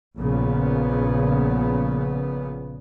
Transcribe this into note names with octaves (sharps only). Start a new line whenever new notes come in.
A#1 A#2 C#3 B3